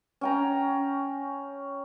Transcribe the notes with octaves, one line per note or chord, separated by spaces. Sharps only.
C#4 G5 A#5